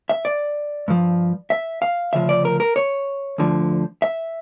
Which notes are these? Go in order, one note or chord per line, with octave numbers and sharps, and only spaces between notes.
E5
D5
G2 F3
E5
F5
D2 C#3 F3 E5
D5
A#4
A#4
C#5
D2 D3 F3
E5